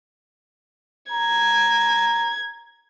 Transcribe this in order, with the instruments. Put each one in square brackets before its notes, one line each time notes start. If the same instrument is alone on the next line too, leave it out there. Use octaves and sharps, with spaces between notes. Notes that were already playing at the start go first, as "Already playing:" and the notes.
[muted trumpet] A#5 [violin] G#6